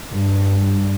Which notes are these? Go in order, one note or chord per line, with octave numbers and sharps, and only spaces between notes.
G2